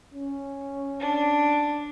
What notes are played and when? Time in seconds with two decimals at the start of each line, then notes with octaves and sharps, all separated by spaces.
0.14 C#4
1.00 D4